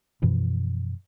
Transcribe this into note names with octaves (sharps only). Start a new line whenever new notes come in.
F#2 B2 E3 F3